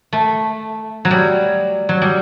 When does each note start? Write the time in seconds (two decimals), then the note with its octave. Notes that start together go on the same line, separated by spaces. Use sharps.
0.13 A3
1.05 F#3
1.11 G3
1.89 F#3
2.02 G3